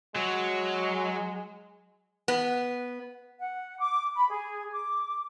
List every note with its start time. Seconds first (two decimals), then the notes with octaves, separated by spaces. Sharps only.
0.16 F#3 G#3
2.28 B3
3.39 F#5
3.79 D6
4.15 B5
4.30 G#4
4.73 D6